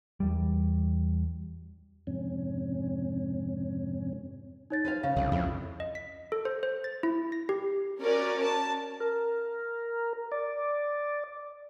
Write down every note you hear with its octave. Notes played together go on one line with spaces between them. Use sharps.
E2 G3
F2 G#2 C3 C#4
D#4 C#5 A6
B4 C5 F5
C#3 F5
C2 C#3
F2 E4
D#5
B6
A4
C5
C5
A6
E4
A#6
G4
C#4 F#4 A#4 D5
A5
A#4
D5